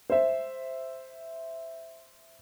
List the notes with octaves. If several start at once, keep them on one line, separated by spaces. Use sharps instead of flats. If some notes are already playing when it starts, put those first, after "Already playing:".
C5 E5